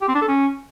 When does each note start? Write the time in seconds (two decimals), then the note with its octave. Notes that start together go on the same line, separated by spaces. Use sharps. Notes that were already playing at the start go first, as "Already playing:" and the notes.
0.01 G4
0.08 C4
0.15 D4
0.21 A4
0.28 C#4